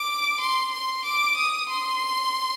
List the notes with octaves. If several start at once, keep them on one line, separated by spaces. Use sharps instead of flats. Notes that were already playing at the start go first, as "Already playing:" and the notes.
Already playing: D6
C6
C6
D6
D#6
C6